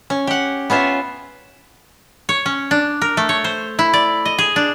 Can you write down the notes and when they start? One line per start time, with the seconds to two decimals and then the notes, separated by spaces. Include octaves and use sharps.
0.10 C#4
0.27 G4 F#5
0.70 B3 C#4 F4 E5
2.29 C#5
2.46 C#4
2.71 D4
3.02 A#4
3.17 A3
3.29 C#5
3.44 C5
3.79 E4
3.93 D5
4.25 D#5
4.38 G#4
4.56 D4